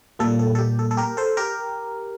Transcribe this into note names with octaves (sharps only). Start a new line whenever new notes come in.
A#2 G3 A#3 A4
A4
A4
G4
A4
A4
G4 A#4
A4 C5
G4 A#4